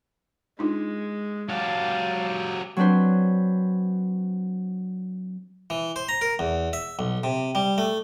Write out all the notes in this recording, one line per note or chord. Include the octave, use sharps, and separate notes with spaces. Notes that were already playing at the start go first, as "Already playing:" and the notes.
G#3 D4 D#4 F4
F#3 G4 F5 A5
F#3 C4 D4 B4 C5
E3
C5
A#5
A#4
E2
E5
B1
C3
G3
A3